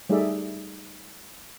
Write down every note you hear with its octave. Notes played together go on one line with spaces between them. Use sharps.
G3 A3 D#4 G#4 D5 E5